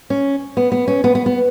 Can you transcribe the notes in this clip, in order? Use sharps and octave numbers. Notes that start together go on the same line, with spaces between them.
C#4
B3
B3
C#4
B3
B3
B3